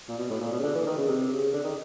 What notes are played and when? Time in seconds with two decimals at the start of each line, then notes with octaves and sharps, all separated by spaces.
0.08 A#2
0.18 B2
0.30 A2
0.41 A#2
0.52 B2
0.59 C#3
0.63 D3
0.75 E3
0.86 D#3
0.98 C#3
1.08 C3
1.31 C#3
1.53 D3
1.64 D#3